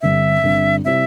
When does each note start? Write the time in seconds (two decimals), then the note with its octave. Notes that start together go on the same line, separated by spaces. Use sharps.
0.01 G1 G2 D3 C4 E5
0.43 G1 G2 D3 C4
0.85 C3 G3 E4 C5 E5